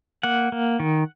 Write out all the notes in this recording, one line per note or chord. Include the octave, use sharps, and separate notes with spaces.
A#3 F#5
A#3
D#3